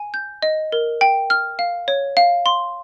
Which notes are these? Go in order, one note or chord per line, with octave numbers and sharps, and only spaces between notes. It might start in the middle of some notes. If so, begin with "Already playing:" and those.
Already playing: G#5
G6
D#5
A#4
G5
F6
F5
C#5
F5
C6